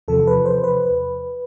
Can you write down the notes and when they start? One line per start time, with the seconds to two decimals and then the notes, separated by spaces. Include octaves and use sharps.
0.08 E2 C3 F3 A4
0.27 B4
0.46 C5
0.64 B4